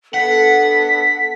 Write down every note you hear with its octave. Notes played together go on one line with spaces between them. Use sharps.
B3 D4 A4 F#5 B6